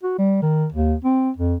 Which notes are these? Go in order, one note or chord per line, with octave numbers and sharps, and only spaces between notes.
F#4
G3
D#3
D#2
C4
F2